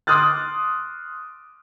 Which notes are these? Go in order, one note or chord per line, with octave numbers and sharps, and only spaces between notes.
C6 D6 D#6 F6 F#6 A6